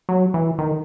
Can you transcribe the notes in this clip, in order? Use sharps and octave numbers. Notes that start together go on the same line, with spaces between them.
F#3
E3
D#3